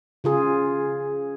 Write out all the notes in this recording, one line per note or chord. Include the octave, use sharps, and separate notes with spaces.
C#3 F4 G#4